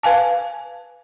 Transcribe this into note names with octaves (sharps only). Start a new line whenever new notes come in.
B4 F5 G#5 A5